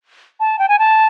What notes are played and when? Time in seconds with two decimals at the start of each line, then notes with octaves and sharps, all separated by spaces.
0.40 A5
0.59 G5
0.69 G#5
0.79 A5